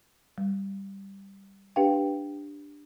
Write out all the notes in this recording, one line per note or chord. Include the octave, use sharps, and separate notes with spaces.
G3
D4 G4 B4 F5 G5